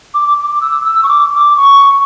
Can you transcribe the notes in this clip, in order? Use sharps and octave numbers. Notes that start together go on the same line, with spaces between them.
D6
D6
E6
E6
C#6
D6
D6
C#6